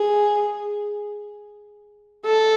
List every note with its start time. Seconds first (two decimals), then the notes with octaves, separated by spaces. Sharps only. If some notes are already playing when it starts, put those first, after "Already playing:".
Already playing: G#4
2.25 A4